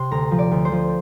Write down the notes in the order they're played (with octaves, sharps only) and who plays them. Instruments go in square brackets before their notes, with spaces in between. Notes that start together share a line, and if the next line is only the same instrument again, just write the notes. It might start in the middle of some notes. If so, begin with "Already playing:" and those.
Already playing: [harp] C3 C6
D2 A#5
F3
D5
D2
C5
F3